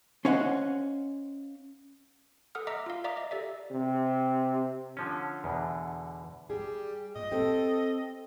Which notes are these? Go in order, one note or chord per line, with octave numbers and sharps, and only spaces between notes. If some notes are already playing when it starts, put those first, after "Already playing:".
C#4 C5 C#5 D#5 F5 F#5
A4 F#5 D#6 F6
D#5 E5 A#5 D6 E6
F4 F5
D5 E5 F5 A#5 D6 D#6
D#5
G4 A4 D5 E5
C3
D3 F3 C#4
E2 B2 D3
G3 G#4
A#2 D#5
C4 G4 A4 G5